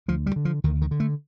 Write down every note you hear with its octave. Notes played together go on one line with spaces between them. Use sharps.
D2 F3
G3
D3
F3
D2 D#3
D#3
D3
A3